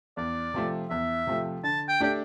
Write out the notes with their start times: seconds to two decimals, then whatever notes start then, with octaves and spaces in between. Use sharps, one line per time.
0.17 E2 D5
0.54 C3 F3 A3
0.90 E2 E5
1.27 C3 F3 A3
1.64 D3 A5
1.88 G5
2.00 A3 D4 G4 D5 G5